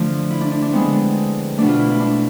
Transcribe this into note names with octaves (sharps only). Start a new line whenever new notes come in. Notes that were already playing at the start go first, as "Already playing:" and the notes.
Already playing: D3 F3 A3 F4
E4
D4
D4
D4
D3 G#3 B3 C4
B2 A3 D4
F4
E4
E4
D4